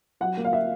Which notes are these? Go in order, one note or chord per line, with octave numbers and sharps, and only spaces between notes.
F#3 F#5
A#3
F5
E5